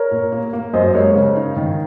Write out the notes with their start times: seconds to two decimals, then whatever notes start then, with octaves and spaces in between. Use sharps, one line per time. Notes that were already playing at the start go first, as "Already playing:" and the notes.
Already playing: A#4 C#5
0.11 A#2
0.32 A#3
0.53 A#3
0.74 F#2 C5 D#5
0.94 G#3 A#4 C#5
1.15 C#3
1.36 D#4
1.57 D#3